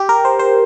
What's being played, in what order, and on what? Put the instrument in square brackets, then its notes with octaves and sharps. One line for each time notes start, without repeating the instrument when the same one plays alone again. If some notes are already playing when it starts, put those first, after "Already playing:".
Already playing: [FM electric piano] G4
A#4
C5
C5